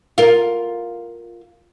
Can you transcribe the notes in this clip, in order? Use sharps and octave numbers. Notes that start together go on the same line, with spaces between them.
F4 A#4